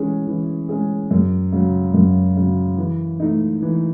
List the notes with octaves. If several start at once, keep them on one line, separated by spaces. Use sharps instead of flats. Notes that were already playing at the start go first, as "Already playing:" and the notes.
Already playing: E3 G#3 C#4 G#4
E3
G#3 C#4 G#4
F#2
C#3 F#3
F#2
C#3 F#3
E3
A3 D#4
E3